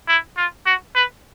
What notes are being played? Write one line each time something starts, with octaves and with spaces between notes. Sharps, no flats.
E4
F4
F#4
B4